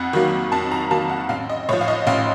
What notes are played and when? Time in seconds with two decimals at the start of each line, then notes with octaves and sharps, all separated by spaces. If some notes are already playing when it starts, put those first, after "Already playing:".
Already playing: F2 F#5
0.13 D#3 F#3 A#3
0.52 F2 A5
0.72 A#5
0.91 D#3 F#3 A#3 A5
1.10 F#5
1.29 A1 F5
1.49 D#5
1.69 A2 F3 C#5
1.81 F5
1.88 D#5
2.07 A1 F5